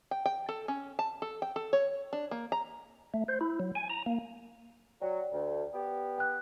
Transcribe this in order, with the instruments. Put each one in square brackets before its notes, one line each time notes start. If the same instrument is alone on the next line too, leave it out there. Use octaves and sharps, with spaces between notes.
[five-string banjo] G5
G5
A4
C#4
A5
A4
G5
A4
C#5
D4
A#3
A#5
[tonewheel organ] A3
C5
E4
F#3
G#5
A#5
A#3
[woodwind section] F#3 [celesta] D5 G5
[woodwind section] D2
B3 G4
[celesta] G5 F#6